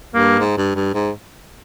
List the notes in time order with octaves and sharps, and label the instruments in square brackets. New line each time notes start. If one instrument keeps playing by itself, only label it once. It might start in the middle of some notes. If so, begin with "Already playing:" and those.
[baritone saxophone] G2 [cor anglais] A#3
[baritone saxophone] G#2
G2
G2
G#2